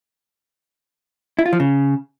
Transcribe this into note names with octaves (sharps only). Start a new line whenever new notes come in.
E4
F4
F3
C#3